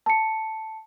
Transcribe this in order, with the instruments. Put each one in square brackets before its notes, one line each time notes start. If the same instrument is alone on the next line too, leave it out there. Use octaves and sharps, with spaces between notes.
[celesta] A5 C#7